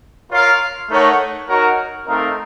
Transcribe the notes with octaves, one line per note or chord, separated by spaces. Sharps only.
F4 A#4 C#5 F5
A3 D#4 A#4 C#5 F#5
D#4 F#4 A#4 C#5 F#5
A3 C4 D#4 A#4 F5